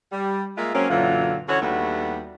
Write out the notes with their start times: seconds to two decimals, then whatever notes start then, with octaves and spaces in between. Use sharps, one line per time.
0.12 G3
0.58 G#3 A#3 F4 E5
0.75 F#3 A#3 C4 C#4
0.90 F#2 A#2 D3 E3 F#3 F4
1.49 D3 E3 C#4 F#4 C#5
1.62 D#2 G3 A3 B3 D4 F#4